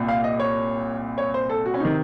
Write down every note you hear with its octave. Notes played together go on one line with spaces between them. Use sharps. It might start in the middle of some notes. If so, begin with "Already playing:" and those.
Already playing: C2 A#2
F5
D#5
C#5
C#5
C5
A4
F#4
C#4
C3 D#3 D#4